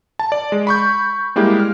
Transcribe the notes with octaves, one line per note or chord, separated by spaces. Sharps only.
A5
D5
G#3
B5 C#6 G6
G3 G#3 A#3 E4 G4
F6